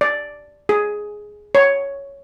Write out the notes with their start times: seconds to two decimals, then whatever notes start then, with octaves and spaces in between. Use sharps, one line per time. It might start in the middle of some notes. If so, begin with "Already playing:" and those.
0.01 D5
0.69 G#4
1.55 C#5